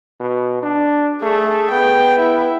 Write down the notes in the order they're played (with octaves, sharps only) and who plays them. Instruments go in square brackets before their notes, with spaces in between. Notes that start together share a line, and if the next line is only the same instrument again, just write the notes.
[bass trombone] B2
D4
[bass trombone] A3 [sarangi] G#4
[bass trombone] B3 [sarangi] G5
[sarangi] E4